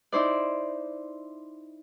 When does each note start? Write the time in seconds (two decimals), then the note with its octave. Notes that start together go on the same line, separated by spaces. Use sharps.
0.12 D#4 E4 C5 D5